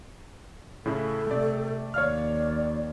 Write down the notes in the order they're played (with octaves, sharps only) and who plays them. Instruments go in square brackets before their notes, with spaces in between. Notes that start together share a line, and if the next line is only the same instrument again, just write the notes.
[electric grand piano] A2 C#3 E4 [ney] A4
[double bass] C3 [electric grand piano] A3 D5
[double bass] D#2 [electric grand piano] C#5 F5 F6 [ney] D5